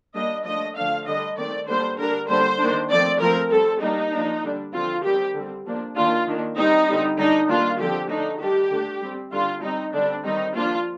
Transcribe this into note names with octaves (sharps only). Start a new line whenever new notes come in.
G3 A#3 D4 D#5
F3 A3 D4 D#5
D3 F3 A3 D4 F5
D3 G3 D4 D#5
D#3 A3 C4 D5
D3 G3 A#3 D4 C5
D3 G3 D4 A#4
D3 G3 A#3 D4 C5
D#3 A#3 D4
F3 A3 C4 D5
F3 A3 C4 A#4
G3 C4 A4
G3 A#3 D4 D#4
F3 A#3 D4
D3 G3 D4
D3 F3 C4 F4
D#3 G3 C4 G4
D3 G3 C4
F3 A#3 D4
D#3 A#3 D4 F4
D#3 A#3 D4
G3 C4 D#4
D3 G3 C4
D3 G3 D4 D#4
D#3 G3 A#3 D4 F4
D3 F3 C4 G4
D3 A3 D4 D#4
D#3 G3 D4 G4
D3 A3 D4
G3 C4
D3 G3 D4 F4
G3 C4 D#4
D3 G3 C4 D4
D#3 G3 C4 D#4
F3 A#3 D4 F4